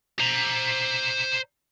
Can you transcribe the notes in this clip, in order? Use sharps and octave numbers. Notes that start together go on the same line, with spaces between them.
C5 A#5